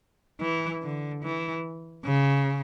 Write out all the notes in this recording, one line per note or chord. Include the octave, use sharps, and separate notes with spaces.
E3
D3
E3
C#3